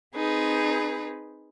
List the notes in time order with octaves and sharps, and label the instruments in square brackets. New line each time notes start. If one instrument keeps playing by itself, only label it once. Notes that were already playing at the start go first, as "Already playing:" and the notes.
[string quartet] C4 D#4 G#4 B4